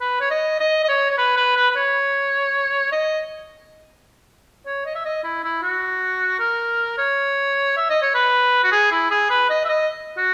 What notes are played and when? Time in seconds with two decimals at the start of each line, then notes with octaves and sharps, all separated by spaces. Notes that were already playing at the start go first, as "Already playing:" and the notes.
0.01 B4
0.21 C#5
0.30 D#5
0.60 D#5
0.84 D#5
0.89 C#5
1.11 C#5
1.18 B4
1.37 B4
1.56 B4
1.70 B4
1.76 C#5
2.92 D#5
4.66 C#5
4.85 D#5
4.95 E5
5.05 D#5
5.24 E4
5.44 E4
5.62 F#4
6.39 A#4
6.98 C#5
7.77 E5
7.90 D#5
8.02 C#5
8.14 B4
8.64 F#4
8.72 G#4
8.91 E4
9.11 G#4
9.30 B4
9.50 D#5
9.65 E5
9.69 D#5
10.17 F#4